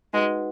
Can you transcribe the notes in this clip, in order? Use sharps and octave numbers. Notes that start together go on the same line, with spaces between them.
G#3 D#4 F#4 B4 F#5